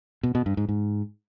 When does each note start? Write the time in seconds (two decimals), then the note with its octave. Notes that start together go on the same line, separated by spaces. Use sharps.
0.23 B2
0.35 B2
0.46 G2
0.57 G#2
0.69 G#2